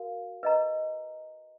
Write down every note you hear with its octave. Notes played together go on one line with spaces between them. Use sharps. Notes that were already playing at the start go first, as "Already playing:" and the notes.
Already playing: F#4 A#4 F5
B4 D#5 A#5